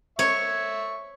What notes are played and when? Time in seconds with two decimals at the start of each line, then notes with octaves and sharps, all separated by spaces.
0.19 C#5 E5 C#6